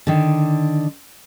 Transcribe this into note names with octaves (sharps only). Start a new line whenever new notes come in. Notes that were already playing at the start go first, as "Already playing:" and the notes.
D3 D#3